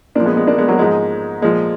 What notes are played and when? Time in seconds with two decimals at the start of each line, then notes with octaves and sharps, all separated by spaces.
0.15 A#2 F3 A#3 D4
0.25 G#3 B3
0.37 G#3 B3
0.47 A#3 D4
0.58 G#3 B3
0.68 F#3 A#3
0.79 G#2 F3 G#3
1.42 A#2 F3 G#3